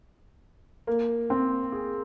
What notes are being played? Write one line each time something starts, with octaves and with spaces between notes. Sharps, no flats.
A#3
C4
G#4